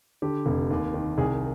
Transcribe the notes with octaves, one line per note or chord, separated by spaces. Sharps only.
D3 G4
F1
D#2
D#3
C2 G#4